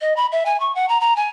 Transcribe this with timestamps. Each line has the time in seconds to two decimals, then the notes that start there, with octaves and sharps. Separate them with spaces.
0.01 D#5
0.16 B5
0.32 E5
0.46 G#5
0.60 C#6
0.75 F#5
0.89 A#5
1.01 A#5
1.16 G#5